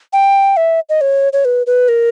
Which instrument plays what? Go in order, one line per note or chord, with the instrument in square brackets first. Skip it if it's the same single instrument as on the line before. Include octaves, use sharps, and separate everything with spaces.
[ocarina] G5
E5
D#5
C#5
C#5
B4
B4
A#4